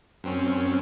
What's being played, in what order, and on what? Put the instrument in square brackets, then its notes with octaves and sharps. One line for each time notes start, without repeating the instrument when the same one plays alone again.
[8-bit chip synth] F#2 C4 C#4